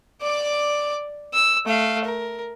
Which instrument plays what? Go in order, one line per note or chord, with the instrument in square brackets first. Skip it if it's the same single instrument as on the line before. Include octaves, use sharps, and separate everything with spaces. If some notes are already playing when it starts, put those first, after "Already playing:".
[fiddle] D5 D6
E6
A3 F5
A#4